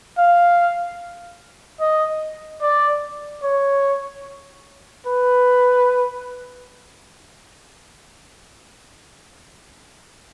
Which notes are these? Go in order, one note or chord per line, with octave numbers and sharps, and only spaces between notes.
F5
D#5
D5
C#5
B4